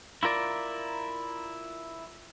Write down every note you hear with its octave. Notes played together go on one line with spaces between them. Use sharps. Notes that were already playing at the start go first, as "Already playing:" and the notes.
E4 F4 A#4 D5